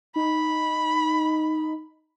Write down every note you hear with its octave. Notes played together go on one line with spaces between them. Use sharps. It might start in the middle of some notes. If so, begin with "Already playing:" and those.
D#4 B5